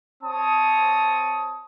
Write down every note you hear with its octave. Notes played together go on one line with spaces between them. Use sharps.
C4 C#5 A5 D#6